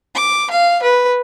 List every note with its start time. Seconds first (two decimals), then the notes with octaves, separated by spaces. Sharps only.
0.15 D6
0.50 F5
0.83 B4